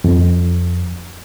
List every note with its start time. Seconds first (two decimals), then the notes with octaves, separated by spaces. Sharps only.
0.04 F2